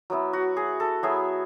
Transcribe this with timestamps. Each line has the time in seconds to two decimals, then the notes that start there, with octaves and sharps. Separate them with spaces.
0.10 F#3 B3 E4
0.33 F#4
0.57 G#4
0.80 A4
1.03 F#3 B3 E4 G#4